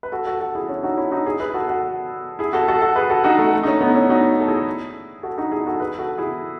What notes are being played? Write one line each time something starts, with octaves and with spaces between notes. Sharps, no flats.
B4
F#4 A4
F#4 A4
F#4 A4
E4 G#4
C#4 E4
D#4 F#4
C#4 E4
D#4 F#4
E4 G#4
G#4 B4
F#4 A4
F#4 A4
E4 G#4
F#4 A4
F#4 A4
F#4 A4
G#4 B4
F#4 A4
D#4 F#4
A3
A3
D#4
A3 C#4
B3 D#4
C#4 E4
D#4 F#4
A4
E4 G#4
F#4 A4
D#4 F#4
E4 G#4
F#4 A4
G#4 B4
F#4 A4
E4 G#4